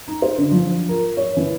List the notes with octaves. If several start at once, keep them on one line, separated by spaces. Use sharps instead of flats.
D#4
C5
D3
F3
A#4
C#5
E3